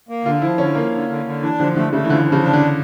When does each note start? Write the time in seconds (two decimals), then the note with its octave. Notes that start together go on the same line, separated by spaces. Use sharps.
0.09 A#3
0.25 D3 F4
0.42 F3 E4
0.58 D3 C#4
0.75 F3 A#3
0.92 D3
1.09 D3
1.26 D3
1.43 E3 D4
1.59 D3 F3
1.76 D3 A3
1.93 C#3 A3
2.05 E3
2.09 D3 F3
2.26 F3
2.32 C#3
2.43 D4
2.53 D3